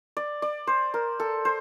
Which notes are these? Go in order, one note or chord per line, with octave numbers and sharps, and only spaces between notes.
D5
D5
C5
A#4
A4
C5